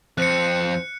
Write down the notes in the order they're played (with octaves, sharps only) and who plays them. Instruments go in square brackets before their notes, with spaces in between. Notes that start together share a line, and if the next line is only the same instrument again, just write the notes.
[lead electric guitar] F2 C4 [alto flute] C5 [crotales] F#6 C#7